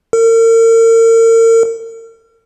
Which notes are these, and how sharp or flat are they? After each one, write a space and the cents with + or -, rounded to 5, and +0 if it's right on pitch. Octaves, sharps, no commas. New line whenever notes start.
A#4 -40